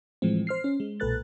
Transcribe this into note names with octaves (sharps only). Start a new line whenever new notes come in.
A2 E3 F3 G#3 C4
C5 F6 C7
C#4
G#3
B1 A#2 A4 B4 F#6 A6